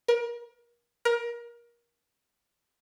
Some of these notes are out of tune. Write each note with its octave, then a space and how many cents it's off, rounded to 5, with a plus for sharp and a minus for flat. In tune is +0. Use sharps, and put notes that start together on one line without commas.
A#4 +35
A#4 +25